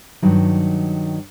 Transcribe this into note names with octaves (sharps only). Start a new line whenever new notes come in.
G2 D#3 F#3